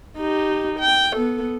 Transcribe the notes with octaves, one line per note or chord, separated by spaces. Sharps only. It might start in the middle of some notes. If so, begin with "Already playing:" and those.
D#4 G4
G5
B3 A4